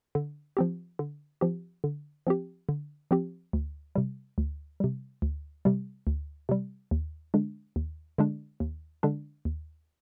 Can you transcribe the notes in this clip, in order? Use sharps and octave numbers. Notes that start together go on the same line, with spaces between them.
D3
F3 C4 G4
D3
F3 C4 G4
D3
F3 C4 G4
D3
F3 C4 G4
D2
C3 G3
D2
C3 G3
D2
C3 G3
D2
C3 G3
D#2
D3 G#3 D4
D#2
D3 G#3 D4
D#2
D3 G#3 D4
D#2